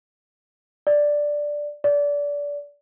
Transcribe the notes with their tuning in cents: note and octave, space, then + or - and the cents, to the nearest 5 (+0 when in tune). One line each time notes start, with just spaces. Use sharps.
D5 +0
D5 -25